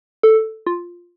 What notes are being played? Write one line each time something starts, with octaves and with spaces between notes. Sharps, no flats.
A4
F4